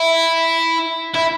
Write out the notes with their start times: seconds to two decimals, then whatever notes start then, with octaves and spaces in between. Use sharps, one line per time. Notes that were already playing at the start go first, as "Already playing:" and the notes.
Already playing: E4
1.14 E4